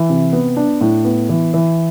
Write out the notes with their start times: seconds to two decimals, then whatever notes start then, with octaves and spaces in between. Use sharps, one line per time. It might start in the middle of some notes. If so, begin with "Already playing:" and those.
Already playing: E3
0.10 C3
0.33 B3
0.57 D4
0.81 A2
1.05 B3
1.29 E3
1.54 E3